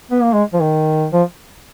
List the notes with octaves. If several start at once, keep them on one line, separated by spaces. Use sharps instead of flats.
B3
A#3
G#3
F3
D#3
F3